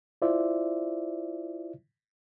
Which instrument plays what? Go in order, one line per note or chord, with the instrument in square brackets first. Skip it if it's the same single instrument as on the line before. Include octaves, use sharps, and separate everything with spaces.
[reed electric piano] E4 F4 C5 D5 E5